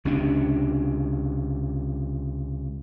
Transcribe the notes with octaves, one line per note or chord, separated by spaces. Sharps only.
C#2 C3 C#4 D4